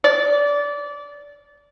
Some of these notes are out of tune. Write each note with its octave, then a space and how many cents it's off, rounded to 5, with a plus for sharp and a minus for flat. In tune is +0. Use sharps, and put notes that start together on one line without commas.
D5 -20